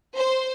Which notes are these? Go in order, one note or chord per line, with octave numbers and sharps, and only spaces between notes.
C5